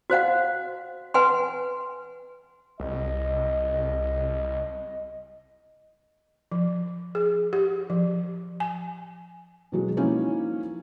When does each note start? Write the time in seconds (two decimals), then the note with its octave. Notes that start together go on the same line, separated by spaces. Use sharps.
0.10 F#4 C5 F5 F#5
1.14 B4 F#5 G#5 C6
2.80 C2 D#5
6.52 F3
7.15 G#4
7.53 G4
7.90 F3
8.60 G#5
9.72 B2 F#3 G#3
9.97 F3 A#3 C#4 D#4 E4